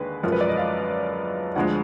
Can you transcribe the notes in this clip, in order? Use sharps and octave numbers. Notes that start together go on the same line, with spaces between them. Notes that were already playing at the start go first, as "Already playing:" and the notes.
Already playing: D#2 D3 G#3 B4
F#2 F3 G#3 A#4
B4
D5
D#5
F5
D2 D3 F3 G#3 F#5